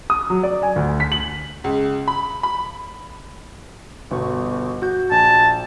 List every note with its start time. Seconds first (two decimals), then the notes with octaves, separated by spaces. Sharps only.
0.10 D#6
0.30 F#3
0.43 D5
0.63 G#5
0.76 D2
1.00 B6
1.12 F#7
1.64 C#2
2.08 B5
2.43 B5
4.11 G1 B2 C#6
4.82 F#4 G6
5.11 A#1 G#5 A5